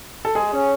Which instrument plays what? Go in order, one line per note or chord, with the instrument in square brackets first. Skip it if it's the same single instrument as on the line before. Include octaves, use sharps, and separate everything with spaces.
[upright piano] A4
[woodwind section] G#3 [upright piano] G#4
[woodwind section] C#4